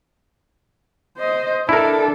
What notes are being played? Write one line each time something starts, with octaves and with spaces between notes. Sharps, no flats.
C5 D#5
D4 E4 A4 A#4